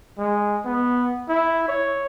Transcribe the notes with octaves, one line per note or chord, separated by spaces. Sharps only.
G#3
B3
E4
C#5